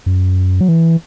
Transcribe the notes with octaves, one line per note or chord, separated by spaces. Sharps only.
F#2
F#3
E3